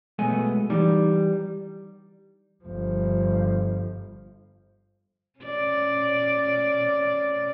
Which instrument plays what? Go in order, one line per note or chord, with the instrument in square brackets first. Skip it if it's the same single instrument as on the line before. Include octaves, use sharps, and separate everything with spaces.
[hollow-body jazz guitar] B1 G#3 A3 B3 G#5
E3 G3 D#4 E4
[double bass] G1 F3
[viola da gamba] C#4 D5